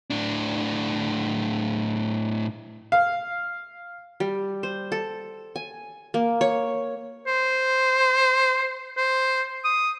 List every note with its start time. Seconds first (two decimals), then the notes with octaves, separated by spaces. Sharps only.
0.10 A2 D4
2.92 F5
4.20 G3
4.63 C5
4.92 A4
5.56 G#5
6.14 A#3
6.41 C#5
7.27 C5
8.97 C5
9.65 D#6